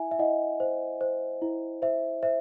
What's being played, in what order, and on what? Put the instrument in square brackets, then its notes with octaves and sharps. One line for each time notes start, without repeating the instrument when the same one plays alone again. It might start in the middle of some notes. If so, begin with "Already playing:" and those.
Already playing: [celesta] E4 E5 G#5
E5
E4 D#5 F#5
C5
C5
E4
C5 E5
C5 E5